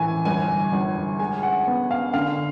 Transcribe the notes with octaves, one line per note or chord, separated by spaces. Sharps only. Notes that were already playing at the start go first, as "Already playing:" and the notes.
Already playing: A2 E3 G#5
G1 G#5
G1
G#3 G#5
F#5
B3
F5
D3 F5